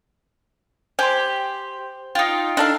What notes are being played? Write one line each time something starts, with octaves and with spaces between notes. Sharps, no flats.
G4 C5 G#5 C6
D#4 F4 G5
D4 D#4 A4 F5